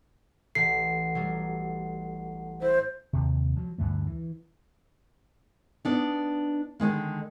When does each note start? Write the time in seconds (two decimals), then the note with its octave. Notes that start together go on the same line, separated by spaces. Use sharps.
0.55 A1 A4 F#5 B6 C7
1.15 F#3 G3
2.62 E4 C5
3.13 D#2 C3
3.56 F3 F#3
3.78 D2 G2 D3 A3
4.07 E3
5.85 B3 D4 D#4
6.80 D3 D#3 G#3 A#3